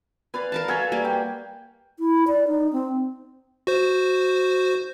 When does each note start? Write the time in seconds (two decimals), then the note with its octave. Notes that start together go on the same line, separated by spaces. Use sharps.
0.34 B4 D5 F5 G#5
0.52 A#4 F5 A5
0.68 F#4 A4 E5 F5 G#5
0.92 G3 A#3
1.05 G5
1.99 E4
2.27 D5
2.48 D#4
2.73 C4
3.67 F#4 C5